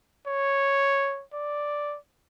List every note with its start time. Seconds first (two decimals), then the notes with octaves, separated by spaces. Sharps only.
0.27 C#5
1.33 D5